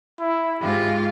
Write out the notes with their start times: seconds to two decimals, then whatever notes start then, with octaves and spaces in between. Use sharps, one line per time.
0.19 E4
0.61 G#2 F4 G4